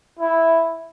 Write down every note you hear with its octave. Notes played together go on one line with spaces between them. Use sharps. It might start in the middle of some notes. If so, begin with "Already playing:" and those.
E4